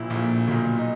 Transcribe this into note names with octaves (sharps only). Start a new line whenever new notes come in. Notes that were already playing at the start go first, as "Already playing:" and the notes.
Already playing: A#1 A#2 E4
A#1 A#2
B1 A#2
D#4